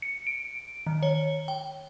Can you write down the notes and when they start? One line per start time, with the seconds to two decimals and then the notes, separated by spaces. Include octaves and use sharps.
0.02 C#7
0.27 D7
0.87 D#3
1.03 C#5
1.48 G5